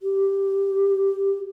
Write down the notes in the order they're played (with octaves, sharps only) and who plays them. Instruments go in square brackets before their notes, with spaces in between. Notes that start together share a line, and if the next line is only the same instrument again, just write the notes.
[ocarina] G4